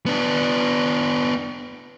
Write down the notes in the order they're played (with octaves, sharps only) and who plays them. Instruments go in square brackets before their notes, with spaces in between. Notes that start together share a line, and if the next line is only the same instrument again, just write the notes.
[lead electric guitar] B3 D4